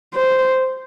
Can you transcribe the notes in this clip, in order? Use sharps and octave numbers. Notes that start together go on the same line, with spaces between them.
C5